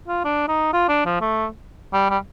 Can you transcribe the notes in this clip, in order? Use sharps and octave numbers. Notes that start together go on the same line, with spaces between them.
F4
D4
D#4
F4
D4
F3
A3
G3
G3